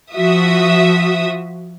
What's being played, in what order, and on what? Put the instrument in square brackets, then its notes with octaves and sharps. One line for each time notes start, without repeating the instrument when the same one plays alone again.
[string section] F3 F#4 E5 D#6